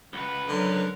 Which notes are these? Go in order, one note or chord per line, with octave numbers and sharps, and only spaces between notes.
C#2 B4 F#5
D3 F#3 A#4